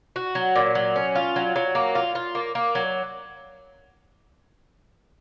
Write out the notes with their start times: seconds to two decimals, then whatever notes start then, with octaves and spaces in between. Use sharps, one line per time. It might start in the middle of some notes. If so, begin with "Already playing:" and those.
0.16 F#4
0.35 F#3
0.55 A#2
0.75 F#3
0.96 C#4
1.15 F4
1.36 F#3
1.56 F#3
1.75 A#3
1.95 F4
2.15 F4
2.35 A#3
2.55 A#3
2.75 F#3